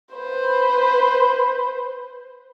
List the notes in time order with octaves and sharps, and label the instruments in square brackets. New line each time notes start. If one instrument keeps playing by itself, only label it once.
[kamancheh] B4 C5